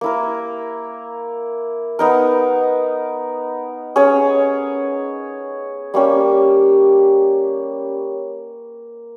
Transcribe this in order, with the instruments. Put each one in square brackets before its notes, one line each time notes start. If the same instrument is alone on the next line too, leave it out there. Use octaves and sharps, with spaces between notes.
[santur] A#3 E4 A#4
B3 D#4 A#4
C#4 G#4 C#5
G3 A#3 C#4 G4